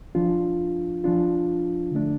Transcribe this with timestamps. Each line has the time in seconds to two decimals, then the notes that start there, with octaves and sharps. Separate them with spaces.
0.15 F3 D4 F4
1.04 F3 D4 F4
1.92 D3 A3 D4